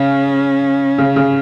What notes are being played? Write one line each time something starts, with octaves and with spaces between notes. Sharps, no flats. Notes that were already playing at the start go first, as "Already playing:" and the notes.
Already playing: C#3 C#4
C#3
C#3